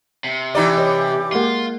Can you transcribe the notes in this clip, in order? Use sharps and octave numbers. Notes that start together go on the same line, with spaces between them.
C3
E3 D#4 G4 D5
C#5 D#5
G#3 A#3 F4 F#5